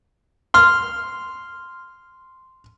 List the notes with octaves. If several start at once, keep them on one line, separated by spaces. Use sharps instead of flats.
C6 F6